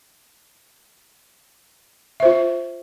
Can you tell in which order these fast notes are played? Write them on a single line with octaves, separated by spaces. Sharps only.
E5 C5 F4